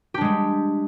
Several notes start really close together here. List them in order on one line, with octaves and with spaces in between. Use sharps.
G4 D4 G#3 G3